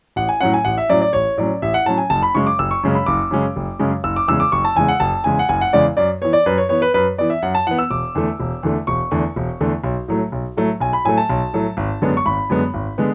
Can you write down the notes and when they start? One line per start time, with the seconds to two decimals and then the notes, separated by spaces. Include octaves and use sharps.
0.16 A1 F#5
0.29 G#5
0.41 A2 F#3 C#4 F#5
0.54 G#5
0.65 A1 F#5
0.78 E5
0.89 A2 F#3 C#4 D5
1.01 D5
1.13 A1 C#5
1.37 A2 F#3 C#4 D5
1.62 A1 E5
1.74 F#5
1.86 A2 F#3 C#4 A5
1.98 G#5
2.10 F#1 A5
2.23 B5
2.34 F#2 C#3 G#3 C#4 C#6
2.47 D6
2.59 F#1 E6
2.71 C#6
2.83 F#2 C#3 G#3 C#4
2.95 B5
3.06 F#1 D6
3.31 F#2 C#3 G#3 C#4
3.56 F#1
3.79 F#2 C#3 G#3 C#4
4.04 F#1 E6
4.16 D6
4.28 E2 C#3 G#3 E6
4.40 D6
4.52 F#1 C#6
4.65 A5
4.76 E2 C#3 G#3 G#5
4.88 F#5
5.00 F#1 A5
5.24 E2 C#3 G#3 G#5
5.39 F#5
5.49 F#1 G#5
5.61 F#5
5.73 E2 C#3 G#3 D5
5.97 F#2 D5
6.22 E3 B3 C#5
6.33 D5
6.46 F#2 B4
6.58 C#5
6.69 E3 B3 C#5
6.82 B4
6.94 F#2 B4
7.18 E3 B3 D5
7.30 E5
7.42 F#2 F#5
7.55 A5
7.67 E3 B3 F#5
7.78 E6
7.90 E1 D6
8.15 E2 D3 A3
8.40 E1
8.63 E2 D3 A3
8.87 E1 C#6
9.11 E2 D3 A3
9.36 E1
9.61 E2 D3 A3
9.84 B1
10.08 A2 F#3 A3
10.32 B1
10.57 A2 F#3 A3
10.80 B1 G#5
10.93 B5
11.05 A2 F#3 A3 G#5
11.18 A5
11.30 B1
11.53 A2 F#3 A3
11.77 G#1
12.02 F#2 D3 G#3 B3
12.17 C#6
12.25 G#1 B5
12.50 F#2 D3 G#3 B3
12.74 G#1
12.98 D3 G#3 B3